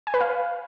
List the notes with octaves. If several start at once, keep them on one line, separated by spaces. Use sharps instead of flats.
G#5
B4
F5